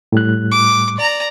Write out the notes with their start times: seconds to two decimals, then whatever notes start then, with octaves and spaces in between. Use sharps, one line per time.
0.12 A2 G3 F#6
0.52 D6
0.96 D5 A#5